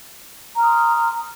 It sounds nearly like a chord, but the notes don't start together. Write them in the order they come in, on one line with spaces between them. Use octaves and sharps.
A#5 F6 D#6 C6